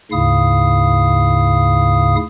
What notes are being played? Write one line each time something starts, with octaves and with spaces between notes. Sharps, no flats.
D2 G#2 C#3 E4 F5 D#6